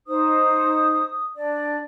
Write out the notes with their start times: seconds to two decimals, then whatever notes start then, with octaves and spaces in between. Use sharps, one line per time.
0.07 D#4 C5 D#6
1.36 D4 D5